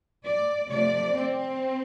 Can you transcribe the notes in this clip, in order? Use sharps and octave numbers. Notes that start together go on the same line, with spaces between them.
D5
C3 F3 A3 D5
C4